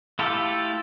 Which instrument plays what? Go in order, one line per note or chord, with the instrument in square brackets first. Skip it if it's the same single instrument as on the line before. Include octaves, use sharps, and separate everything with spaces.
[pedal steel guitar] A3 E4 F4 G4 A4